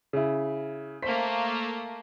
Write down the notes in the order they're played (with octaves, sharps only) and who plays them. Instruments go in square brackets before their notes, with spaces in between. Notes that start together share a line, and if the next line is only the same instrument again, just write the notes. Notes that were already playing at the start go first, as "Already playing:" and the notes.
[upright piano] C#3 E4
[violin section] A3 A#3 [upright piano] C5 B6